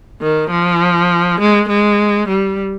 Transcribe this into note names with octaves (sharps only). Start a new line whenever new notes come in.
D#3
F3
G#3
G#3
G3